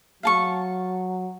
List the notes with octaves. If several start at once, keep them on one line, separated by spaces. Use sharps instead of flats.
F#3 F5 A5 C#6